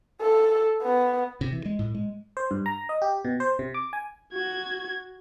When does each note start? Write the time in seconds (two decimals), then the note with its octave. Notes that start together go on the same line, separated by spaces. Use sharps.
0.21 A4
0.83 B3
1.41 C3
1.53 E3
1.65 G#3
1.79 A2
1.95 G#3
2.37 C5
2.51 G2
2.66 A#5
2.89 D#5
3.02 G4
3.25 B2
3.40 C5
3.59 C3
3.74 D6
3.93 G#5
4.34 F#4 G#6